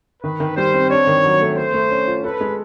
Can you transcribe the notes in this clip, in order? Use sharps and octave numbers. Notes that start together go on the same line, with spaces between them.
D#3 B4
D#3
G3 C5
C4
D4 C#5
D#3
F#3
A3
A3 C5
A3
C#4
F4
A4 B4
G#3